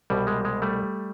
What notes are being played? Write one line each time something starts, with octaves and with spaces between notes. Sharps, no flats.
C2 B2 G3
G#3
G#3
G3 A3